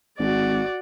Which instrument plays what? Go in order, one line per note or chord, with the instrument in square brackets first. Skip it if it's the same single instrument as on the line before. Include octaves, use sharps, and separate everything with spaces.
[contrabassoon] G#1 [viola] F#4 D5